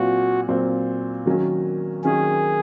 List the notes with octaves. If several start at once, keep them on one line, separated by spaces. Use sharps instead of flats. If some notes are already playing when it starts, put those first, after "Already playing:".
Already playing: A#2 F#3 C4 F4 F#4
A#2 F#3 C4 F4 C5
D#3 F#3 A#3 C#4
D#3 F#3 A#3 C#4 G#4